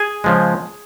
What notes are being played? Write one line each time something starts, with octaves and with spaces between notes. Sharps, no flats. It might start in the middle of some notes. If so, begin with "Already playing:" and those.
Already playing: G#4 G#5
C#3 F3 G#3